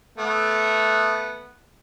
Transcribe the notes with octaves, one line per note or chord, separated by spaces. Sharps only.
A3 B3